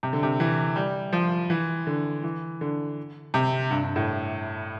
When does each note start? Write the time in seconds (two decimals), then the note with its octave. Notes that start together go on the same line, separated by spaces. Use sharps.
0.03 C3
0.13 D3
0.23 C3
0.40 E3
0.76 G3
1.13 F3
1.50 E3
1.87 D3
2.23 E3
2.61 D3
3.34 C3
3.71 G2
3.83 G2
3.96 A2